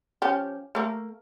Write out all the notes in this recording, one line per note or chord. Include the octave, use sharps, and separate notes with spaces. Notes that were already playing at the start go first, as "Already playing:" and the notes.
F3 C#4 G4
A3 A#3